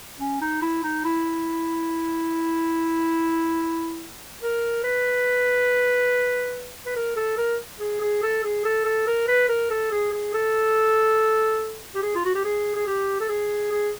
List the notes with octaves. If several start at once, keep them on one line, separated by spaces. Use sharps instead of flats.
C#4
D#4
E4
D#4
E4
A#4
B4
B4
A#4
A4
A#4
G#4
G#4
A4
G#4
A4
A4
A#4
B4
A#4
A4
G#4
G#4
A4
G4
G#4
F4
F#4
G4
G#4
G#4
G4
A4
G#4
G#4